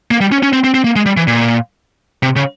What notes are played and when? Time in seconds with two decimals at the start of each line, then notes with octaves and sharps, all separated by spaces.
0.11 A#3
0.21 G3
0.32 C#4
0.43 C#4
0.53 C4
0.64 C4
0.74 C4
0.84 A#3
0.96 G#3
1.06 G3
1.17 E3
1.28 A#2
2.23 C3
2.36 C#3